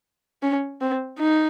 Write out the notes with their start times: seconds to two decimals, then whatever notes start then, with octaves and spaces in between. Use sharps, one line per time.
0.42 C#4
0.81 C4
1.19 D#4